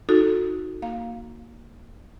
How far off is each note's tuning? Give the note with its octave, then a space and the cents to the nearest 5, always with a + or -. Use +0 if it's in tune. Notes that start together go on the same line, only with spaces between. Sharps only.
D#4 +10 F#4 -20 A4 +0
A#3 +0 F5 +5